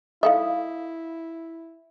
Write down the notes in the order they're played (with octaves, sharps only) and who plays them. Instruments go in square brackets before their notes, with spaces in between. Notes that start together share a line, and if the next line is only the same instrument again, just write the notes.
[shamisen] D#4 A4 E5 [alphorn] E4 [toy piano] F5 D#6